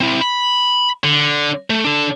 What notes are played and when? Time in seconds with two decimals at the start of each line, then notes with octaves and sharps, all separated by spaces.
0.01 C4 E4
0.21 B5
1.04 D3
1.70 A3
1.85 D4 A4